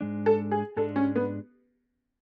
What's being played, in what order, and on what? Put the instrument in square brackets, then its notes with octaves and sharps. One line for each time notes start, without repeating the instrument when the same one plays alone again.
[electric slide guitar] G#2 G#3 D4
[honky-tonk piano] A4
G#4
[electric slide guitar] G#2 G#3 D4 [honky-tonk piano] A4
[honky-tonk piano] C#4
B3